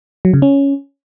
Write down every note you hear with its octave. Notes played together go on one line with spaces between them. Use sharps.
F#3
C#3
C#4